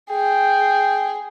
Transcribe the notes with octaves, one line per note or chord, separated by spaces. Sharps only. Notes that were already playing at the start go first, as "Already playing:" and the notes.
G#4 G5